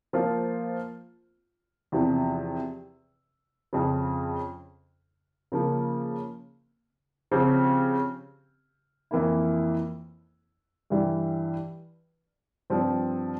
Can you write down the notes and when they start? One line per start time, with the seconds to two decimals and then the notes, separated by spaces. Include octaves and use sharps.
0.13 F3 A#3 F4 C5
1.92 E2 C3 F3
3.73 F2 C#3 F3
5.52 C#3 F3 A#3
7.31 C#3 F3 C4 G4
9.11 F2 E3 A#3 E4
10.90 G2 E3 G3
12.70 G2 F3 C4